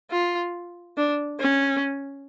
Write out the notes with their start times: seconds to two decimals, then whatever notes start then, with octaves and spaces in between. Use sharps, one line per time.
0.11 F4
0.97 D4
1.40 C#4